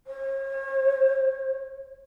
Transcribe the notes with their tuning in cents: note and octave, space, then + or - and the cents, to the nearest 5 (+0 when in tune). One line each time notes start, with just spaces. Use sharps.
C#5 -40